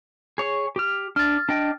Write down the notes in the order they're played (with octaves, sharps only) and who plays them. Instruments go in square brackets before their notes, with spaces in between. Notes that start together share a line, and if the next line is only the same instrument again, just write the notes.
[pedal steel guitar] G#4 C#5
G4 F6
[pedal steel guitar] D4 [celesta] F6 A6
[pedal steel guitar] D4 D#5 G5